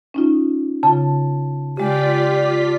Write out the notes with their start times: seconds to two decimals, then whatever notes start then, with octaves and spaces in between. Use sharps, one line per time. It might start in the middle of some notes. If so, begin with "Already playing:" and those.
0.14 C#4 D#4 F4
0.83 C#3 F4 A5
1.77 C#3 G#3 F4 G4 D5 B6